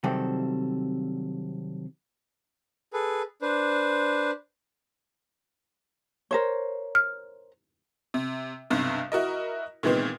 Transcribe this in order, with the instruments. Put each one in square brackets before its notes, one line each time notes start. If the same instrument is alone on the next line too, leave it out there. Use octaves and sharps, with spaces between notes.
[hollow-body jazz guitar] C3 D#3 F#3 G3 C4 A4
[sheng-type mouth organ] G#4 A4 B4
D4 B4 C5
[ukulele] A#4 C5 C#5
[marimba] F6
[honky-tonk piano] C3
B1 G2 C3
E4 F#4 A#4 D#5
A#2 D#3 E3 G#3 B3 C4